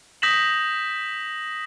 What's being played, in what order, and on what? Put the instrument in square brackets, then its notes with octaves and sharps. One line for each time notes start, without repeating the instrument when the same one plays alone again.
[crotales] D#6 G6 A#6 B6 E7 F#7